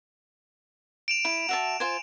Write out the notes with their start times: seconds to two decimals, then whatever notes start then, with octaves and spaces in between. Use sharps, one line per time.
1.08 D7 E7 F7
1.25 E4
1.49 F#4 E5 A5
1.80 F4 C5 G#5